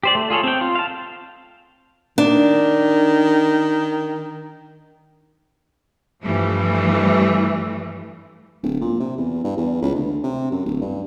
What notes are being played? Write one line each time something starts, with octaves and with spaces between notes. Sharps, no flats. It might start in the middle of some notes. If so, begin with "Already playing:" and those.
G4 C5 D5
A3
F4 G#4 A4 C#5
C4 G5
F4
F5 A5
D#3 D4
G2 E3 F3 G3 A3
D1
A#2
C3
E2
G2
E2
C#2
D2
C3
F#2
D1
G2